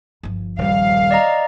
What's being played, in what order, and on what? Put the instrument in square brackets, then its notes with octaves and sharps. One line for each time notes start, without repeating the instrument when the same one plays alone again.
[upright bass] G1 F3
[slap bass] D#1 G3 [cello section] F5
[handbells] D5 D#5 A#5